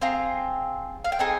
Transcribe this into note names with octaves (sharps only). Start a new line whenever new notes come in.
C4 F4 G#4 A#5
F5
G5
C4 D#4 G#4 G#5